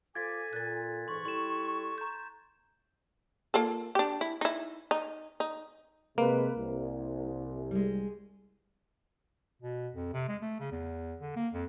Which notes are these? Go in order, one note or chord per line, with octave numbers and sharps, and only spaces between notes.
F4 A4 C5 G#5 D6 G#6 A6 B6
A#2 F#6 A6
G#2 E3 C6 C#6
G3 E4 A4 C6 E7
A#5 G6
A#3 F4 A4
D4 G4
E4
D#4 E4
D#4
D#4
C3 G#3 A#3 B4
C2
G3 G#3
B2
F2
C3
G#3
A3
C#3
E2
D3
A#3
F2